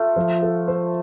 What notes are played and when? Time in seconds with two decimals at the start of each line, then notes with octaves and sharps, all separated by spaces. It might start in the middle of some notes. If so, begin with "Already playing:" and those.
Already playing: A3 F4 A4
0.16 F3
0.42 A4
0.68 C5